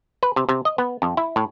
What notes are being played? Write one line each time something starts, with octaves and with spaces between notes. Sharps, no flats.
B4
C3
C3
D#5
B3
F2
E4
A2